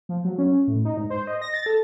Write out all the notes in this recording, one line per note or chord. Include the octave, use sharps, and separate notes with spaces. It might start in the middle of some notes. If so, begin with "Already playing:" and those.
F3
F#3
C#4
A2
D#4
G#2
C5
D#5
A#6
A6
A4